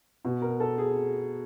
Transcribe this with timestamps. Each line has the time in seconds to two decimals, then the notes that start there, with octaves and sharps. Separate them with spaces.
0.25 B2
0.42 A#4
0.60 A4
0.78 G#4